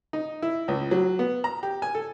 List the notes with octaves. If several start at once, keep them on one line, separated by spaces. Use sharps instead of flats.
D#4
E4
C#2
F#3
B3
A#5
G4
G#5
A4